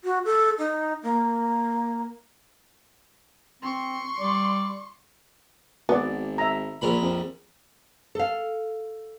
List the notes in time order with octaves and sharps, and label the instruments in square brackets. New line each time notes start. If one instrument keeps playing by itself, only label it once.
[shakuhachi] F#4
A4
D#4
A#3
[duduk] C4 [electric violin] C6 C#6
[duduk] G3 [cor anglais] D5
[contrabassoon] G#1 [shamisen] B3 [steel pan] F#4 D5
[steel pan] E5 A#5
[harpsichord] A#1 A#4 B5 [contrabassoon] A#2
[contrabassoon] F2
[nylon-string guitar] A4 F5